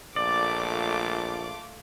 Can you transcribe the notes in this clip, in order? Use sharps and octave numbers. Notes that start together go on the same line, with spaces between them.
A#1 A3 F4 D5 D6